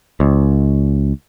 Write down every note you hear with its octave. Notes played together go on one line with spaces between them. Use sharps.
C#2